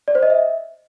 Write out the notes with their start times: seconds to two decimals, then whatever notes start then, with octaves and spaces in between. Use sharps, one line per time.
0.08 D5
0.15 C5
0.23 D#5
0.30 E5